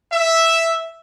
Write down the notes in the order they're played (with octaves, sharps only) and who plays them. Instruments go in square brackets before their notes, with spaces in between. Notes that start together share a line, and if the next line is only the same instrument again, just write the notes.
[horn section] E5